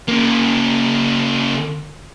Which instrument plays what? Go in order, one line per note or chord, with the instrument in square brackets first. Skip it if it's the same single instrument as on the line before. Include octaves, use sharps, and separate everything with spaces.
[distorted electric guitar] C#3 A#3